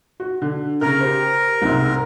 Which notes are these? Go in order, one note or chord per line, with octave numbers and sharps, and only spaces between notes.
F#4
D3
C#3 A#4 F6
G4 C5
C2 G#2 C3